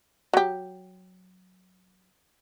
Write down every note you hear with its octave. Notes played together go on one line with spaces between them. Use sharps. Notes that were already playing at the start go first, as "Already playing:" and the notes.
F#3 G4